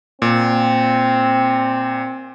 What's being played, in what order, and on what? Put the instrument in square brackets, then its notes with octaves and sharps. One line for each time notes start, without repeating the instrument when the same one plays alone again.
[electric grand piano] A#2 [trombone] C4